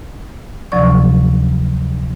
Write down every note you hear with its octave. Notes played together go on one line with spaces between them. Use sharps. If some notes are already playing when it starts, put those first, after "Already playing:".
D2 C3 F3 F#3 D5 C#6